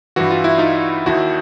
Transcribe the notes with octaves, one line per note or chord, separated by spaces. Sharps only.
G2 E3 F#4
F4
E4
D#4 F4
D#2 D#3 E4 F#4